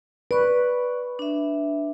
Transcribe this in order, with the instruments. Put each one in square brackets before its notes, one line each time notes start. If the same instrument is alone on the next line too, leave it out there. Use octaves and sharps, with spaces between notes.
[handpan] B4 [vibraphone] D5 C#6
[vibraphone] D4 E5